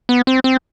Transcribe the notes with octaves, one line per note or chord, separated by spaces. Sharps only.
B3
C4
C4